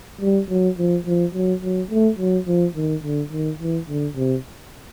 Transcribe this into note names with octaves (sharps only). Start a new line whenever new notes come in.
G3
F#3
F3
F3
F#3
F#3
A3
F#3
F3
D#3
D3
D#3
E3
D3
C3